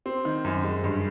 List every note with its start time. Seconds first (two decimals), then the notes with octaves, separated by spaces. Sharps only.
0.06 C4
0.25 D#3
0.44 F#2
0.64 G#3
0.84 G2